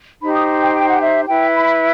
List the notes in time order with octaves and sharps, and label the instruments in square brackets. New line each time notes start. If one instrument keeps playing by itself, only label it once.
[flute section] D#4 G4 C5 B5
D#6
G5
G5
F#5
E5
E4 B4 G5
B5